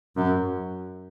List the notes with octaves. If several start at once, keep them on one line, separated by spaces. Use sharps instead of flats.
F#2